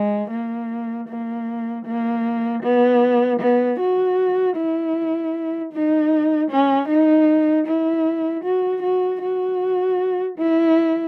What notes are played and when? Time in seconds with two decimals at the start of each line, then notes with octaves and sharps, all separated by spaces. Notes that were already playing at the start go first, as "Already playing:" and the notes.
Already playing: G#3
0.31 A#3
1.08 A#3
1.85 A#3
2.63 B3
3.40 B3
3.80 F#4
4.56 E4
5.73 D#4
6.51 C#4
6.89 D#4
7.67 E4
8.44 F#4
8.83 F#4
9.21 F#4
10.38 E4